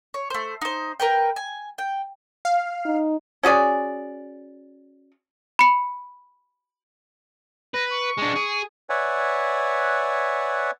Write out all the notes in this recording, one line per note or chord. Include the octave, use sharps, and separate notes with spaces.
C#5
A3 C5
D#4 C5
A#4 B4 G5
G#5
G5
F5
D#4
C#4 F#4 G#4 D5
B5 C#7
B4 A#6
C#6
G#3 D4
G#4
B4 C#5 D5 E5 F#5 G#5